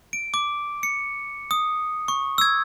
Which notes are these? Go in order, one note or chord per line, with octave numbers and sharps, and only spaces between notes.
D7
D6
C#7
D#6
C#6
E6 G#6